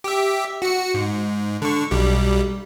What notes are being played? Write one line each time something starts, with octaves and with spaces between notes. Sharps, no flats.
G4 E5
F#4 C#7
G#2
D3 C#6
B1 G3